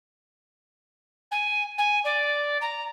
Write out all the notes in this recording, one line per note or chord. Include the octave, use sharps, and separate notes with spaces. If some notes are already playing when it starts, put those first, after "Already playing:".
G#5
G#5
D5
A#5